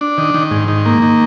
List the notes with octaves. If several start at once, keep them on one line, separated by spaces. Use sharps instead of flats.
D4
D#3
D#3
G#2
D#3
A#3
D#3